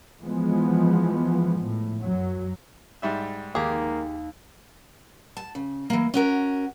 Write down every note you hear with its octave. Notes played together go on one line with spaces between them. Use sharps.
E3 F3 G#3 B3
A2
F#2 F#3
G#2 G3 E5
D#2 A#3 G4 G#4
A5
C#3
E3 A#3
C#4 F#4 A#4